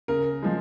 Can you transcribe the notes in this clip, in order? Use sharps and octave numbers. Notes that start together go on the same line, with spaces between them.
C#3 A#4
F3 G#3